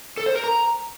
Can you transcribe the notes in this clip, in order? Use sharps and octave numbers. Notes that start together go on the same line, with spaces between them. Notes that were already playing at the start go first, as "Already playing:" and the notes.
A4
C5
A#4
A#5